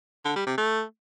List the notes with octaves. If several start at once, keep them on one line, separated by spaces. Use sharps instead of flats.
D3
G3
C3
A3